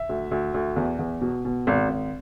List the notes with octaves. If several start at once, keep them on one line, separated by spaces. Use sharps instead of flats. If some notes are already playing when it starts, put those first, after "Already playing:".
Already playing: E5
D2
D2
D2
E2
E2
B2
B2
G#1
G#1